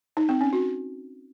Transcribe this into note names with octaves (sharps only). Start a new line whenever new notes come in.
D#4
C4
C#4
F#4